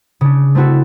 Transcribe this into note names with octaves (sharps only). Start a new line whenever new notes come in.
C#3 D4
A3 C4 E4 F#4 A4